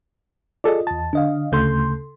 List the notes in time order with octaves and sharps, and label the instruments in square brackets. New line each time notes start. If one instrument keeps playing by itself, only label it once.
[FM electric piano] F4 D#5 [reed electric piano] G#4 A4 D5
[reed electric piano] E2 A5
[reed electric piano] D3 [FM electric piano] D4 D#5 F5
[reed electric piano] D2 A3 G6 [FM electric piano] C#3 A4 C6